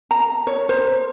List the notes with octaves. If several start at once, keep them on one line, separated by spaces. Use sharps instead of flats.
A#5
C#5
C5